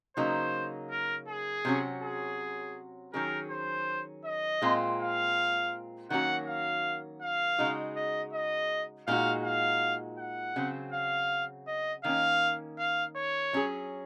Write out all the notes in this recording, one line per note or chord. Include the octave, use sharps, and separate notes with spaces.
C#3 F#3 A#3 D#4 C5
A#4
G#4
C3 F#3 C#4 F#4
G#4
D#3 F#3 C#4 G#4 A#4
C5
D#5
A#2 G#3 C4 F4
F5
D#3 F#3 A#3 C#4 F#4 F#5
F5
F5
C#3 G#3 D#4 F#4
D#5
D#5
A#2 G#3 D#4 F#4 F5
F5
F#5
C#3 F#3 C4
F5
D#5
D#3 A#3 C#4 F5
F5
C#5
F#3 C#4 G#4